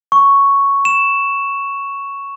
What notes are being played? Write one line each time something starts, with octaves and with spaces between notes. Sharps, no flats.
C#6
E7